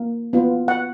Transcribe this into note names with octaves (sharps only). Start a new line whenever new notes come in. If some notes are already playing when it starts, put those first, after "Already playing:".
Already playing: A#3
B3 F4
F#5